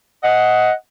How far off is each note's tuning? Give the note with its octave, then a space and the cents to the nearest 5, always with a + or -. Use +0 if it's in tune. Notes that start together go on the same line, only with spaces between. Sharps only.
D#5 +15 F#5 +0